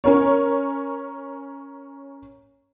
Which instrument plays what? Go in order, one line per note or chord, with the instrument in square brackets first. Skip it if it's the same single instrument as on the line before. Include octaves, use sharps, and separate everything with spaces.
[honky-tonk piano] C#4 A#4 C#5